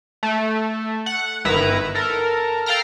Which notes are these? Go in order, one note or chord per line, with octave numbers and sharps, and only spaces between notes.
A3
F#5
G1 D#3 E4 B4 A#5
A4 A#4
A4 F5 G5 A#5 F6